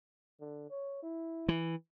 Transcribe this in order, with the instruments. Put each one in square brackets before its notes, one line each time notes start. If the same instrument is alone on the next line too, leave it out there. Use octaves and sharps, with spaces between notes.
[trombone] D3
C#5
E4
[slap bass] E3